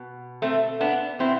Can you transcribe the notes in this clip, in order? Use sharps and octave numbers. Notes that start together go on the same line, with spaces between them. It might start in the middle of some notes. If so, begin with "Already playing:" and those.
Already playing: B2
A3 C4
B3 D4
B2 C4 E4